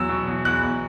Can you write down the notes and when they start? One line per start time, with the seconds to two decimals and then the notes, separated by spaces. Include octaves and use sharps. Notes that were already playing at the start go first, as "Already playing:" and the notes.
Already playing: E2 F#3 E6
0.09 B2
0.27 E2
0.45 E2 F#6
0.63 E2